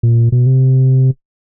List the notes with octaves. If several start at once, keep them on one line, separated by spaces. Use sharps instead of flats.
A#2
B2
C3